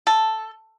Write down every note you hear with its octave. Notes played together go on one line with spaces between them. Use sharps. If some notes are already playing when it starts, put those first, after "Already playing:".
A4